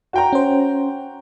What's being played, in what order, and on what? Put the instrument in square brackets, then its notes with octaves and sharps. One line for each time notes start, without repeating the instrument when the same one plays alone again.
[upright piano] F#4 G5 A#5
[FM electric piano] C#4 C5